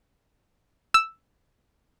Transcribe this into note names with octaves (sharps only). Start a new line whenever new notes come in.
E6